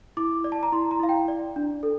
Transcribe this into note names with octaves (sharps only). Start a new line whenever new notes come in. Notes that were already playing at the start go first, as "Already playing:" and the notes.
E4 D6
D5
A5
A#5
E4 C6
A#5
E4 F5
G5
D5
D4
A4